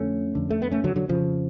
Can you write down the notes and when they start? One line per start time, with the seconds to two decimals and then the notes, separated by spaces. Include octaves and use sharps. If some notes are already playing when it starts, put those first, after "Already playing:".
Already playing: F2 D3 A3 C#4
0.35 F2 D3
0.50 A3
0.62 B3
0.71 A3 C#4
0.84 D3 F#3
0.96 D3 F#3
1.09 F2 C#3 F3